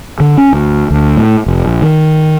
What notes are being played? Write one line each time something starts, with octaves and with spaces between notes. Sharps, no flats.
D3
C#4
D2
D2
A2
F1
A#1
D#3